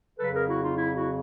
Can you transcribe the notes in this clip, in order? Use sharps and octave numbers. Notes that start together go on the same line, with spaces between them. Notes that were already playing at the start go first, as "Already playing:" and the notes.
F2 C#3 F#3 A4 B4
G#4 A#4
E4 F#4
D#4 F4
E4
E4 F#4